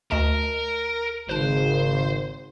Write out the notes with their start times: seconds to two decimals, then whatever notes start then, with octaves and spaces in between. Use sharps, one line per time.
0.11 D2 A#4 D#5 A5
1.29 G#1 C#3 B4 C5 A5